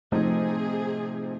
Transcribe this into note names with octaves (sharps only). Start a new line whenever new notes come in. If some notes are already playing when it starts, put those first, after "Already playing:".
C3 F3 A3 D#4 G#4